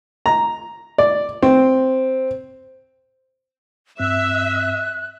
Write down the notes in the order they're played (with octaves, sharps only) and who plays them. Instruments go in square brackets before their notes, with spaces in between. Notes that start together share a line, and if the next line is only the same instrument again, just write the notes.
[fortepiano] A#5
D5
C4
[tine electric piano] G2 C4 [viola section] E5 [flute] F#6